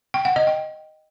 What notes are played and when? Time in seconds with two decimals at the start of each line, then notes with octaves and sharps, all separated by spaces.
0.14 G5
0.25 F#5
0.36 D#5
0.47 G5